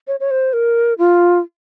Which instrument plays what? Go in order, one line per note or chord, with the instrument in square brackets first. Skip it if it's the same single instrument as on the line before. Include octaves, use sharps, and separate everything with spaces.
[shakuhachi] C#5
C#5
C5
A#4
F4